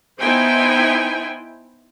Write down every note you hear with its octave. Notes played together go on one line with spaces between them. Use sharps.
B3 D#4 E4 C5 G5 G#5